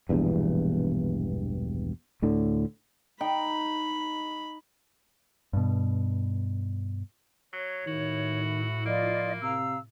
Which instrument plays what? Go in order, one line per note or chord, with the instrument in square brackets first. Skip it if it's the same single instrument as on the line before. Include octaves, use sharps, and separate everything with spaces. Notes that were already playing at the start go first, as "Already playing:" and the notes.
[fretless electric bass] E1 A#1 E2 G2
D2 A2 D3
[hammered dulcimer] D#4 [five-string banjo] G5 [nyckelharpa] B5
[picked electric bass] G2 B2
[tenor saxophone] F#3 [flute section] C#5
[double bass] A2 E4 [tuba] D#3 [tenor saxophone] F#4
[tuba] F3 [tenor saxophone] A#3 [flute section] F4 D5 D#5
[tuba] C3 [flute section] F5 A#5 E6